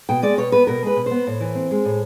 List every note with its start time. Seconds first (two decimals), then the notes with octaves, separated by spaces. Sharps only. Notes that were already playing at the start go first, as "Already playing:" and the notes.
0.09 B2 G5
0.22 G#3 D5
0.38 B2 C#5
0.52 B3 B4
0.67 B2 A#4
0.83 G#3 B4
0.96 B2
1.06 B3 C5
1.27 A2
1.41 E3
1.55 C4
1.71 G#3
1.85 A2